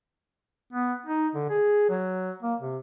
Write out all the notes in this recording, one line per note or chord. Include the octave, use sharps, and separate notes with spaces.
B3
D#4
D3
G#4
F#3
A#3
C3